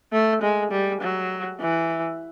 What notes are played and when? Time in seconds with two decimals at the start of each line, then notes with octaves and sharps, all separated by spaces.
0.12 A3
0.42 G#3
0.72 G3
1.01 F#3
1.60 E3